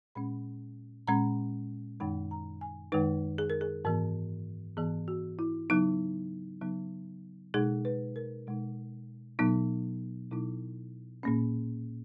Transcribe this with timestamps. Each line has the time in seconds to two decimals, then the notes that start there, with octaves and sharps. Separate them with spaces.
0.15 A#2 G#3 C#4 B5
1.08 A#2 G#3 C#4 A#5
2.00 F#2 D#3 G#3 D#4 B5
2.31 A#5
2.61 G#5
2.92 F#2 D#3 G#3 D#4 B4
3.38 G#4
3.50 A#4
3.61 G#4
3.85 G#2 E3 B3 A#4
4.77 G#2 E3 B3 G#4
5.08 F#4
5.39 E4
5.70 C#3 F#3 B3 D#4
6.61 C#3 F#3 B3 D#4
7.54 B2 G#3 D#4 G#4
7.85 B4
8.16 A#4
8.47 B2 G#3 D#4
9.39 B2 F#3 B3 D#4
10.31 B2 F#3 B3 D#4 E4
11.23 A#2 A#3 C#4